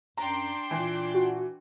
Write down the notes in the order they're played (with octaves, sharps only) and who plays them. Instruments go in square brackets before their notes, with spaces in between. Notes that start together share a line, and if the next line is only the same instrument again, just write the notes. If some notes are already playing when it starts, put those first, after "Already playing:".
[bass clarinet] F#2 [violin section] D4 G5 C6 [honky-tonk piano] A#5
[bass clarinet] A#2 [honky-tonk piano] E3
[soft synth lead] F#4